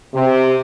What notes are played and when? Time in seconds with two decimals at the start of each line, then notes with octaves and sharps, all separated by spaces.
0.14 C3